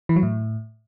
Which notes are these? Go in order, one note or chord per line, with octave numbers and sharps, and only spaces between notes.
E3
F#3
A2